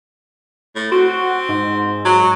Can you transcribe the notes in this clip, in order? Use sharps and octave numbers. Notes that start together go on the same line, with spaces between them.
A2
C4 F#4
G#2
F#3